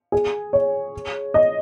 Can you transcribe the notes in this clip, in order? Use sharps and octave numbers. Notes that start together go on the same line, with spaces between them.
G#4
C#5
D#5